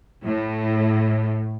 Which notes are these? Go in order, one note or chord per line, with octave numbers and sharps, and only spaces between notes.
A2